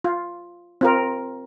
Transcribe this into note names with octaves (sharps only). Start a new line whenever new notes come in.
F4
C4 F4 A#4